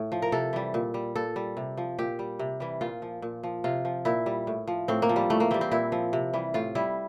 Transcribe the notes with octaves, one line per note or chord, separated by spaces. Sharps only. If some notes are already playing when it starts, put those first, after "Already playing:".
Already playing: A2
F3
A#4
C3 A4
E3 G3
A#2
G3
A#2 A4
G3
C3
F3
A#2 G4
G3
C3
E3 G3
A#2 F4
F3
A#2
F3
C3 F4
F3
A#2 E4
G3
A2
F3
A2 C4
A#3
F3
G3
A2 A3
A#3
E3 G3 C4
C4
A#2 E4
F3
C3
E3 G3
A2 F4
G3 E4